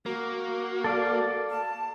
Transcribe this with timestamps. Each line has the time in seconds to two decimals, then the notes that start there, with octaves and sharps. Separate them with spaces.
0.06 A#3 F#4
0.84 A4 D5 F5
1.50 A5